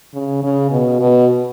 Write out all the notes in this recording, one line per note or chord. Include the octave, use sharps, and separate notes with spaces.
C#3
C#3
B2
B2